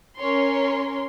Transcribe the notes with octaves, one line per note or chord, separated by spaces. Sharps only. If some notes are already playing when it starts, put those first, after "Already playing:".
C#4 A#4 C#5 C6